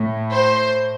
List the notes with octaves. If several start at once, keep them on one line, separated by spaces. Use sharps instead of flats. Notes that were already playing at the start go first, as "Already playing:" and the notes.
Already playing: A2
C5